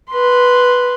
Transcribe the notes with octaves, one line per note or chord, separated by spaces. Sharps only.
B4 C6